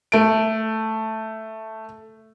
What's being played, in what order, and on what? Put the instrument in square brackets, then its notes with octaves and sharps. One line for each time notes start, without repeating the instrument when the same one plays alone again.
[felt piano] A3 D7